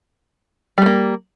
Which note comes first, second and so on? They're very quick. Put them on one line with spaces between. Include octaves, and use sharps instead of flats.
G3 A3 A#3